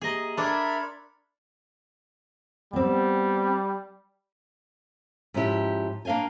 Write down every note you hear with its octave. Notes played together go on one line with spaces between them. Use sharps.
A#3 G4 G#4 D#5 A#5
D4 A4 A#4 E5 B5 C6 F6 G#6
G3 B3 C4
G#2 F3 C#4 E4 G4 G5
A#3 D4 F5 G5 G#5